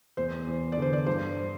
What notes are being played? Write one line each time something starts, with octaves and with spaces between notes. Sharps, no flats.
E2 C5
E2
D5
D3 C5
D5
G2 C5